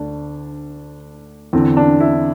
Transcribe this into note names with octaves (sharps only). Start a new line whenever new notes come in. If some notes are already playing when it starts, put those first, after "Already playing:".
Already playing: D2 D3 D4
E2 D3 C4
D4
E4